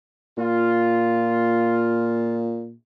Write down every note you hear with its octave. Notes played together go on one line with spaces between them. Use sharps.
A#2 F4